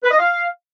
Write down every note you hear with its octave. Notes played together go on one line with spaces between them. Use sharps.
B4
D#5
F5